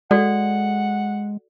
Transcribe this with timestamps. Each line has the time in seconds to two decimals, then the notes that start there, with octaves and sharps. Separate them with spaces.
0.11 G#3 F#4 A4 D5 F#5